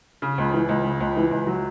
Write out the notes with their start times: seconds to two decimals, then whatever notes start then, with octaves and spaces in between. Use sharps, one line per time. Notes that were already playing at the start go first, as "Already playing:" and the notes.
0.22 C#3
0.38 C#2
0.54 E3
0.69 C#2
0.85 C#3
1.00 C#2
1.16 E3
1.31 C#2
1.47 F#3